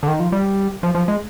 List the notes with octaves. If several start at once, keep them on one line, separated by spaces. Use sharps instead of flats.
D3
D#3
F3
G3
F3
F3
G#3